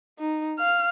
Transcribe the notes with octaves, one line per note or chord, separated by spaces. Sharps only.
D#4
F5 F6